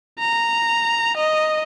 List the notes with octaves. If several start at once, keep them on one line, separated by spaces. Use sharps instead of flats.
A#5
D#5